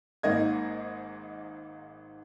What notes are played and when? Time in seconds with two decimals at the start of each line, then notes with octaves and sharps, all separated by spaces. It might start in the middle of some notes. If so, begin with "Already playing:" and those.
0.23 G#1 G#2 A#3 D#5 G#6